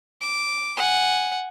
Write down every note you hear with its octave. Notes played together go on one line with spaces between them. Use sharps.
D6
F#5 G#5